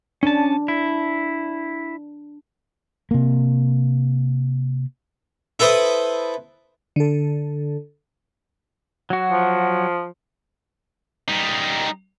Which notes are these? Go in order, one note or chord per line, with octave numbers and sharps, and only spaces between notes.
C#4 D4 A5
E4
C3 A#3
E4 A4 B4 C5 D#6
D3 A4
F#3 F#4
F3
G3 D#4